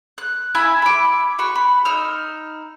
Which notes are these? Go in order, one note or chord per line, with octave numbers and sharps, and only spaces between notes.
F#6
E4 E5 G#5 B5
B5 D6
F#4 B5 C#6
B5
D#4 E6 F6